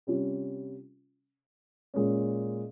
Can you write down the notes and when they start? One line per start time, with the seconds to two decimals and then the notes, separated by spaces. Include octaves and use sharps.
0.07 C3 G3 C#4 F4
1.94 A#2 G#3 C#4